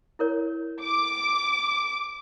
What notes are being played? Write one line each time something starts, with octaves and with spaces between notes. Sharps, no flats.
E4 A#4 C#5
D6